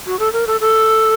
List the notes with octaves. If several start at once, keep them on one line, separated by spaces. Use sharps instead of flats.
F#4
A4
A#4
A4
A4